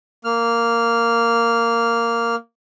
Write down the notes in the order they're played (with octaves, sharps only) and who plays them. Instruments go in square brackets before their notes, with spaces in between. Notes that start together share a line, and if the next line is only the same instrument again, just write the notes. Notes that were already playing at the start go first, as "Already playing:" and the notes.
[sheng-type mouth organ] A#3 F6